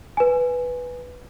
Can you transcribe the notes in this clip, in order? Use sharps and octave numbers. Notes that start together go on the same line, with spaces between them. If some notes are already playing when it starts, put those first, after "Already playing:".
B4 G#5